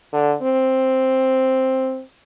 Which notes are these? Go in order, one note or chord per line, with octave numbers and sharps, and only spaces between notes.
D3
C4